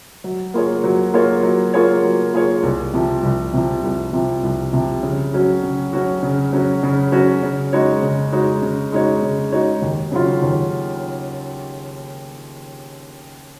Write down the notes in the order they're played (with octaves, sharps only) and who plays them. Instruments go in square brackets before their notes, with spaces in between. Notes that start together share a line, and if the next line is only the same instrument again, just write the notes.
[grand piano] F#3
A#3 F4 G#4 C#5
F#3
A#3 F4 G#4 C#5
F#3
A#3 F4 G#4 C#5
F#3
A#3 F4 G#4 C#5
C2
C3 F3
C2
C3 F3
C2
C3 F3
C2
C3 F3
C#3
F#3 C#4 F#4
C#3
F#3 C#4 F#4
C#3
F#3 C#4 F#4
C#3
F#3 C#4 F#4
C#3
G#3 D#4 F#4 C#5
C#3
G#3 D#4 F#4 C#5
C#3
G#3 D#4 F#4 C#5
C#3
G#3 D#4 F#4 C#5
D#2
C#3 F#3 C#4 F4
D#2